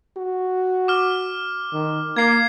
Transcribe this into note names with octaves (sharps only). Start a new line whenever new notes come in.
F#4
D6 F6
D#3
A#3 G#6 C7